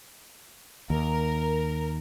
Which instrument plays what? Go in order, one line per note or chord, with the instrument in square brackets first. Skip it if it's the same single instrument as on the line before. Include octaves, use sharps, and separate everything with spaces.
[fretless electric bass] D#2 [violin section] A#4